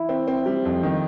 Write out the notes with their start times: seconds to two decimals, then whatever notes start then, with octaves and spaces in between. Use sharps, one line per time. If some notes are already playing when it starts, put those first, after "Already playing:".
Already playing: E4
0.09 C4
0.28 C4
0.46 G3
0.65 F2
0.83 D#3